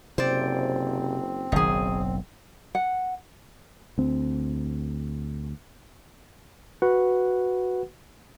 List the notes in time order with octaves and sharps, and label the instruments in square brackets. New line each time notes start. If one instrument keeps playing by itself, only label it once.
[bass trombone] F#1 [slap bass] C3 [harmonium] C4 [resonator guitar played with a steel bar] C5 D5
[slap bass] F#1 B1 [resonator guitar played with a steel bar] D#3 G#4
[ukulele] F#5
[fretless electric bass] D2 C4
[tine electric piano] F#4 B4 F#5